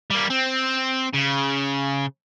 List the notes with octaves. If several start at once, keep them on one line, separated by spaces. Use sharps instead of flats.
G3 A#3
C4
C#3